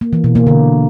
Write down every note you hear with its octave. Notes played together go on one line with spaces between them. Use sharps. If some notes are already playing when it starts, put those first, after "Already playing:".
A#3
E3
B2
A#3
D3